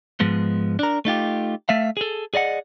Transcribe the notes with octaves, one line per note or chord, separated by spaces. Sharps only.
G#2 F3 G#3 B3
D4 A#4
A3 D#4 F4 G4
A3 E5 F5
G#4 A4
G#4 D5 D#5 F#5